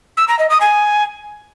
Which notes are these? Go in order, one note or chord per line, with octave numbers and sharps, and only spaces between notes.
E6
A#5
D#5
D#6
G#5